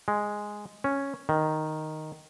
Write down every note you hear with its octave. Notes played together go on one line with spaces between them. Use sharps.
G#3
C#4
D#3